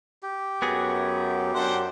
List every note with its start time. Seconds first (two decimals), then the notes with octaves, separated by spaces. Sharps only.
0.23 G4
0.62 F#2 B3 F#4 G#4
1.54 F#2 D4 C5 F#5